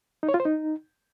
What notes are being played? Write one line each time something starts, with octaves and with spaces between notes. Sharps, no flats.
D#4
C#5
F4
C5
D#4